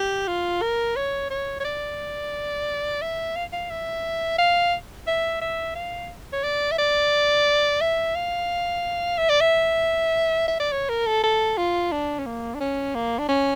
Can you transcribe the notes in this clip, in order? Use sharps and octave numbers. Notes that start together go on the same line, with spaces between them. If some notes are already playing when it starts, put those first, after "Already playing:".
Already playing: G4
F4
A#4
C#5
C#5
C#5
D5
E5
F5
F5
E5
F5
E5
E5
F5
C#5
D5
E5
D5
E5
F5
E5
D5
E5
E5
D5
C#5
A#4
A4
A4
F4
D4
C#4
A#3
D4
C#4
A#3
D4
C#4